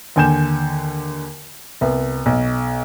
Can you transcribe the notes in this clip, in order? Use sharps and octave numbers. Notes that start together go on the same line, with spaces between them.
D#2 D3 G#5 G6 E7
C2 B3
B1